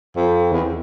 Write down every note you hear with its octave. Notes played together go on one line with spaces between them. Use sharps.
F2
E2